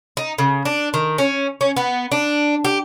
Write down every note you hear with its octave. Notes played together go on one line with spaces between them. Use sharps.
D#4
C#3
D4
D#3
C#4
C#4
B3
D4
G4